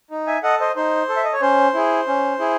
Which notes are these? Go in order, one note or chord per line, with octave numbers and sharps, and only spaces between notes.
D#4
E5 G#5
A4 D#5 F#5
C5 D#5
D#4 C5
A4
E5
D#5
C#5
C#4 C5
E4 G#4
C#4
E4 G#4